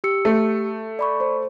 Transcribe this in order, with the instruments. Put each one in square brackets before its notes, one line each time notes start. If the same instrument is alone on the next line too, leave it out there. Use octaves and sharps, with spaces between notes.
[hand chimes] G4 E6 C#7
[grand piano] A3
[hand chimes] D5 B5 C#6
C5